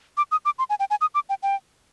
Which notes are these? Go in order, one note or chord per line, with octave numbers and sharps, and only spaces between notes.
D6
D#6
D6
C6
G#5
G5
G#5
D#6
D6
G5
G5